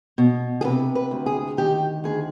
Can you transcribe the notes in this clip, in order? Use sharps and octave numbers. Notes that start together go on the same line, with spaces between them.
B2
G#4
C3 B4
B4
D2
G#4
D#3 G4
D2 G#4